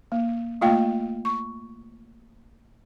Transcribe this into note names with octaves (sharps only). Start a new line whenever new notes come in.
A#3
A3 A#3 F4 F5 G5
C#6